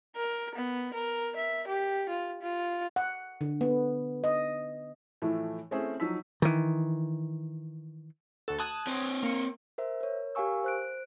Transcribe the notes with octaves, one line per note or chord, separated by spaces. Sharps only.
A#4
B3
A#4
E5
G4
F4
F4
F#5
D3
B3
D#5
A2 E3 F3 A3
A3 C4 C#4 E4 G#4 C5
F3 F#3 D#4 E6 B6
D#3 E3
D2 F#4 A4
A5 D#6 F#6 G#6
C4 C#5
A#3 C#7
A#4 C5 E5
A#4 C#5
G4 A#4 F5 G#5 C#6 E6
C5 F#6 D7